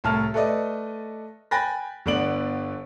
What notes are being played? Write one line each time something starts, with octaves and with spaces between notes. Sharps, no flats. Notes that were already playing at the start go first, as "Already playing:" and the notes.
C2 A2 A5 F6
A3 A4 B4 D5 D#5
G5 G#5 B5 F#6 A6 A#6
G1 D3 B3 D5 D7 F#7